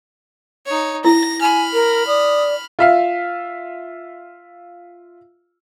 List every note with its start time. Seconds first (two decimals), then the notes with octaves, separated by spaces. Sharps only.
0.66 D#4 C#5
1.04 E4 A#6
1.41 G#5 B5 F6
1.73 A#4
2.08 D5 D#6
2.79 F4 E5 F5